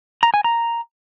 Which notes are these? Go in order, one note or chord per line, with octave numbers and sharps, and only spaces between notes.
A#5
G#5
A#5